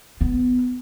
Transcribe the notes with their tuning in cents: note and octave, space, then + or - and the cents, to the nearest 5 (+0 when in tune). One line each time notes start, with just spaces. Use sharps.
B3 +15